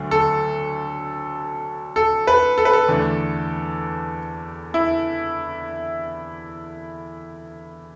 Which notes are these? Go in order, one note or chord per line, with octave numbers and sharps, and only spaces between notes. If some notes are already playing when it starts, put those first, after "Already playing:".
Already playing: D2 D3 F#3 A3
A4
A4
B4
A4
B4
A4
E2 D3 A3
E4